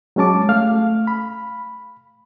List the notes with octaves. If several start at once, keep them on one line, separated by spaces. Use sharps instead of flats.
F#3 G#3 C#4 A5 D6
A3 F5 F6
B5